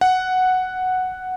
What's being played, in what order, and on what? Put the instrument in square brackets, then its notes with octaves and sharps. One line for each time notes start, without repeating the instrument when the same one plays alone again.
[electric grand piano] F#5